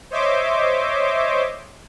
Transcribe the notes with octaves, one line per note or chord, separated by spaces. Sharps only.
C5 C#5 D#5 E5 C6 D6